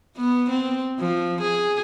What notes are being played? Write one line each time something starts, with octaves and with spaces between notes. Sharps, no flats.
B3
C4
F3
G#4